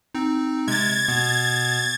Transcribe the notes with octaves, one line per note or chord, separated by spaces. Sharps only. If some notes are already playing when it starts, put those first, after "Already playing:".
C4 D#4
C3 G#3 G#6 A6
B2 B3